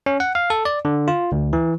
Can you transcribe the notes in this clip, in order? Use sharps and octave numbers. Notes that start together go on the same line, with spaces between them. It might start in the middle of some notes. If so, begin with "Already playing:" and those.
C#4
F#5
F5
A4
D5
D3
F4
D2
E3